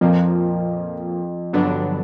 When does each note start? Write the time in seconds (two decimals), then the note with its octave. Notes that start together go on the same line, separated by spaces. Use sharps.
0.01 F2 A#2 F3 A#3
1.53 G2 D3 F#3 B3 D4